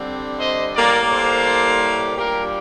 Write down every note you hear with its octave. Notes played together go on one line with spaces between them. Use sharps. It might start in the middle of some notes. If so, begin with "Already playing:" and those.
Already playing: D3 G3 C4
C5 D#5
A2 G3 A#3 A#4 D5
A4 C5
A#2 G3 D4 G4 A#4